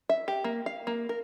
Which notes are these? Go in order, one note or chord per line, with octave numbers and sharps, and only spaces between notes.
E5
G4
A#3
F5
A#3
A#4